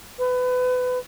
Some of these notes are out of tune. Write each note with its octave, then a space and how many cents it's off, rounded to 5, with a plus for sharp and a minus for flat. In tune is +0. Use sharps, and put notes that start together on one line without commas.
B4 +25